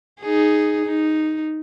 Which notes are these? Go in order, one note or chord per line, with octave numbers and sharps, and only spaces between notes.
D#4 G#4
D#4